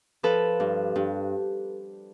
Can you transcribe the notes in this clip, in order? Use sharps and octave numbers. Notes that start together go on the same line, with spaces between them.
F3 A4 B4
G2
G2